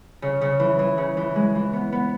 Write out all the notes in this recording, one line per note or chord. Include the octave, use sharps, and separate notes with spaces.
C#3
C#3
E3
E3
C#3
E3
G#3
E3
B3
B3